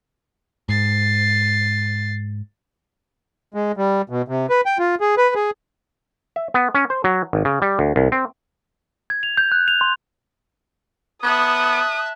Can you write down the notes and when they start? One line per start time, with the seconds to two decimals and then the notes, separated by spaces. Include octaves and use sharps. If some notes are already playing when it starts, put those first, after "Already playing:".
0.69 G#2 A6 C7
3.54 G#3
3.77 G3
4.10 B2
4.28 C3
4.50 B4
4.66 G5
4.79 F4
5.01 G#4
5.18 B4
5.35 G#4
6.36 E5
6.54 B3
6.75 C#4
6.90 C5
7.04 F#3
7.33 G#1
7.45 C#3
7.62 G3
7.79 D2
7.96 C2
8.12 C4
9.10 G#6
9.23 F7
9.37 G6
9.52 F#6
9.68 F7
9.81 C6
11.23 B3 E5 A5 D#6 F#6